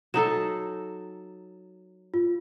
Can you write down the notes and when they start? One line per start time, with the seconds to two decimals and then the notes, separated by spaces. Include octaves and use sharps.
0.14 F#3 D#4 A4 E7
2.14 F4